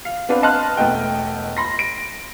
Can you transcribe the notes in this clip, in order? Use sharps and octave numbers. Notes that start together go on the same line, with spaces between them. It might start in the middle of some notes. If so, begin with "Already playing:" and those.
F5
B3 C4 D4 B4 F5
D#5 A5 C6 F6 F#6
E1 A3 B3 D#5 G5
B5 C6 A#6
D7